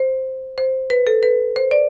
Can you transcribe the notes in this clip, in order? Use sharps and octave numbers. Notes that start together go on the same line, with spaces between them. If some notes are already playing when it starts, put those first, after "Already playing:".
Already playing: C5
C5
B4
A4
B4
C5
D5